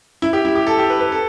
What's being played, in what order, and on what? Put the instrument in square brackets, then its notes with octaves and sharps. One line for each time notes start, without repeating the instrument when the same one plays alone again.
[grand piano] E4
G4
E4
G4
A4
G4
B4
B4
A4